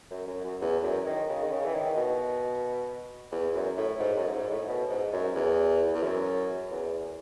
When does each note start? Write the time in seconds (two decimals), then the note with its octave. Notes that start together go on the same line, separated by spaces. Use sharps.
0.11 F#2
0.27 F#2
0.44 F#2
0.62 E2
0.84 F#2
1.06 D#3
1.29 C#3
1.43 D#3
1.52 C#3
1.65 E3
1.74 D#3
1.97 B2
3.32 E2
3.55 F#2
3.78 A2
4.00 G#2
4.17 F#2
4.27 A2
4.34 G#2
4.51 A2
4.68 B2
4.90 G#2
5.13 F#2
5.35 E2
5.95 E2
6.03 F#2
6.71 E2